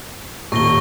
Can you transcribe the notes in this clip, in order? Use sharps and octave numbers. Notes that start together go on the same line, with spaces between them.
D#1 C#6 A#6 G7